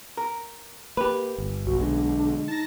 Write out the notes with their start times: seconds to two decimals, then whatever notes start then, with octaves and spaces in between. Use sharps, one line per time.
0.17 A#4
0.97 A#3 G4 B4
1.38 G1
1.66 B1 F#4
1.80 D3 G#3 D4
2.48 D#4 A5 A#6